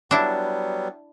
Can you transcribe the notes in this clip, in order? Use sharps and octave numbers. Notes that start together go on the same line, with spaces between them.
F#3 G3 B3 D4 E4